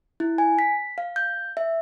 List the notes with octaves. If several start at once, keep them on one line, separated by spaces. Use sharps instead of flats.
E4
G#5
B6
F5
G6
E5